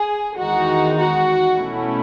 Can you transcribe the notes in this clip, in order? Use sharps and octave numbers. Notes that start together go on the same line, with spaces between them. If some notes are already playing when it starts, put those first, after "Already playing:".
Already playing: G#4
E2 D#3 G#3 D#4 F#4
F#4
B2 A3 C#4 E4